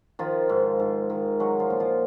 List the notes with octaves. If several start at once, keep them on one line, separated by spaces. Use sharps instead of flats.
D#3 F3 F4
G#2
G#2
D#3
F#3 G#3 F#4
F3 F4
A#2
F3 F4